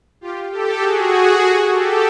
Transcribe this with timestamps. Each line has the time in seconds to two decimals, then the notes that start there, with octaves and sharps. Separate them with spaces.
0.21 F4 G4
0.51 G4 A4
0.80 F#4 G#4
1.39 F#4 G#4
1.69 G4 A4